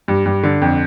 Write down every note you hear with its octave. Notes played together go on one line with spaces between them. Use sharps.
G2
G2
D3
F2